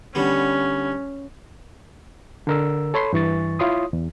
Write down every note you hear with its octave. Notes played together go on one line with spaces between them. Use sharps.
D3 G3 B3 C#4
D3 A#4 E6
A4 C#5 B5 C6
G2 E3 C#6 A6
E4 F4 C#5 C6 D#6
E2